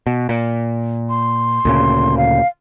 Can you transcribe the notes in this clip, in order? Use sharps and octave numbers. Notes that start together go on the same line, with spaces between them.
B2
A#2
C6
D2 A#2 C#3
F5